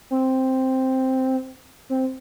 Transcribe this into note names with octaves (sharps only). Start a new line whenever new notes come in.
C4
C4